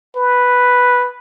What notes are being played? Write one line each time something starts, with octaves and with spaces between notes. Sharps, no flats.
B4